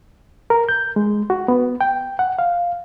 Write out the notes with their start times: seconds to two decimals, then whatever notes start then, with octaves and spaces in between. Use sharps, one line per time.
0.50 A#4
0.69 G6
0.96 G#3
1.30 F#4
1.48 B3
1.81 G5
2.19 F#5
2.39 F5